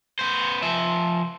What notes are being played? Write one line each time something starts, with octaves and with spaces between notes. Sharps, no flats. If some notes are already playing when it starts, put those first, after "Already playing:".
B3 C5
F3 E5